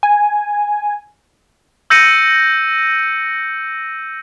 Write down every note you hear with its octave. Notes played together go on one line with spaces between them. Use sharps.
G#5
E6 G6 A#6 C#7 D#7